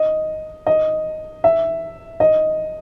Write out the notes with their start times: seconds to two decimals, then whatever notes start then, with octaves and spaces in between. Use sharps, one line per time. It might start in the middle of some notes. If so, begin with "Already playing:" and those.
Already playing: D#5
0.67 D#5
1.44 E5
2.20 D#5